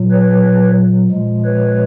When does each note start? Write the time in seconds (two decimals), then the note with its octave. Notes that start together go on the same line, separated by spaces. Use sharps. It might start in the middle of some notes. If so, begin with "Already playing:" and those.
Already playing: A#2 F#3
0.11 B4 C#5
1.11 A#2 F3 G#3
1.44 B4 C#5